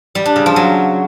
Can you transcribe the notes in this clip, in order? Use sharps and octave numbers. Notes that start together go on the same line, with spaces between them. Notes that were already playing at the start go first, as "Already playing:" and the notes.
G3
D4
C#3
F3
F#3